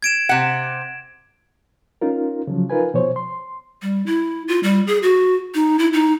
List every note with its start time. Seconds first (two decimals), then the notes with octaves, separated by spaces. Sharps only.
0.03 G#6 D7 E7
0.29 C3 F#5
2.01 C#4 D#4 F4 A#4
2.47 C#3 F3 F#3
2.70 D#4 F4 A#4 B4 G#5
2.94 B2 F3 C5 C#5
3.16 C6
3.82 G3
4.06 E4
4.48 F4
4.63 G3
4.87 G#4
5.03 F#4
5.54 D#4
5.79 E4
5.93 D#4